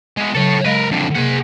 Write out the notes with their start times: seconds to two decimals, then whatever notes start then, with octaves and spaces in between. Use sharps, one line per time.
0.17 G#3 B3
0.35 C#3 F#3 A4 C#5
0.65 G#3 A#4 B4 D#5 F5
0.91 F2 D3
1.15 C3 A#3 G#4 F#5